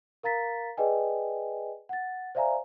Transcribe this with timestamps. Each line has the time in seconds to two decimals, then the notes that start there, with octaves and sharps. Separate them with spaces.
0.23 A#4 F5 A#5 A6 B6
0.77 G#4 B4 D5 D#5 G5 G#5
1.89 F#5 A6
2.35 C5 D5 E5 F5 G#5 A#5